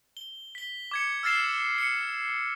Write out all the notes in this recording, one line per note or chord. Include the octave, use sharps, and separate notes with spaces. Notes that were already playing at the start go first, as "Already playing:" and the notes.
G7
B6 G7
D6 G#6 C#7
E6 F6 A6 C7 E7
C#7